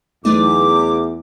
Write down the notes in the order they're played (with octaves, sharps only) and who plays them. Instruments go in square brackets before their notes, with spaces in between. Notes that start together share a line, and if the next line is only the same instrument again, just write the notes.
[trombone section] E2 [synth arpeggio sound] F#3 A3 D#4 [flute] D6